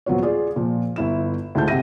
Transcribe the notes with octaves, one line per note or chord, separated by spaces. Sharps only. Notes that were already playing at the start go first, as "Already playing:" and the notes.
D#1 F#3 B3 F4 C#5
F4 G#4 D5
A#2 F3
G1 E4 E7
D2 G#2 E4 F4 A5 G6
C3 E5 F#5 A#6 D#7